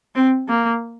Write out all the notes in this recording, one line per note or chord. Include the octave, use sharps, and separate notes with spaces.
C4
A#3